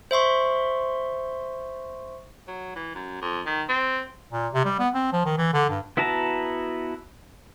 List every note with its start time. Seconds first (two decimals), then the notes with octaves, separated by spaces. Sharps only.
0.11 C5 E5 C6 C#6
2.47 F#3
2.76 E3
2.95 F#2
3.22 F2
3.46 D#3
3.69 C4
4.32 A#2
4.53 C3
4.65 G3
4.79 B3
4.94 C4
5.12 F3
5.25 D#3
5.37 E3
5.53 D3
5.69 G2
5.97 B3 E4 F#4 A5 A#5